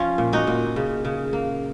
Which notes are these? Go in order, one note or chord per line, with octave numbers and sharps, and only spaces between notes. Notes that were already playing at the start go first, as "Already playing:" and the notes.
Already playing: F3 C#4 F4
A#2
D#4 F#4
A#2
C#3
C#3
A#3